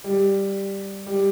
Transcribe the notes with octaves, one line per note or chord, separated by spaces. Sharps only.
G3
G3